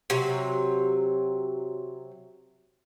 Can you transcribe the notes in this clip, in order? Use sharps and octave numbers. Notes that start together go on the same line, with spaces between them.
C3 F#3